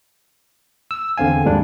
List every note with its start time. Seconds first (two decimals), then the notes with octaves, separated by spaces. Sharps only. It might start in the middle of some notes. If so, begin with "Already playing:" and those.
0.91 E6
1.17 E2 D3 C4 F5 G#5
1.45 D#2 G#2 G3 D4